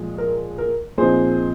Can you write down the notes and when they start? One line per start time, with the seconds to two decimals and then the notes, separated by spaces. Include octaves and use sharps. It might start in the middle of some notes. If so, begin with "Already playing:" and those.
Already playing: A#2 F3 G#3
0.18 A#4
0.58 A#4
0.98 A#2 F3 C4 D#4 G#4 C5